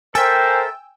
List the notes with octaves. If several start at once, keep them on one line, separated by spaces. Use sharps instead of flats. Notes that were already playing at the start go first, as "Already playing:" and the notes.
A4 A#4 C5 E5 G5 G#5 E6